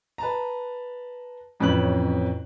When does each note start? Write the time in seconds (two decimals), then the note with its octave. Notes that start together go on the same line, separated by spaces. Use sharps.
0.18 B4 A5 A#5
1.60 A1 F2 C#4 B4 F#6 F#7